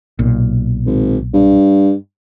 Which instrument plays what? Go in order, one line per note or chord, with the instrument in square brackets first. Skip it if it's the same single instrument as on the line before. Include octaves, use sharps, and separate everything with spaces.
[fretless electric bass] B1 A#2
[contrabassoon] G#1
G2